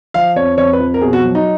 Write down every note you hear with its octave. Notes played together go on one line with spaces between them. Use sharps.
F3 F5
F2 C#5
F2 C#5
B4
F3
A#4
B2 G#4
F#4
F#3
D#4